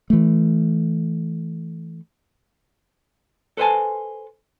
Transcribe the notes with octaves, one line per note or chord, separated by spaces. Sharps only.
E3 A3
A4 B4 C5 D5 G#5 A5